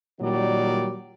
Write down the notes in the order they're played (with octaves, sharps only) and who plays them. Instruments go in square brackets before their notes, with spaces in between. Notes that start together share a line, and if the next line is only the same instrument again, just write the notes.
[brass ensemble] A#2 D#3 F#3 G3 D5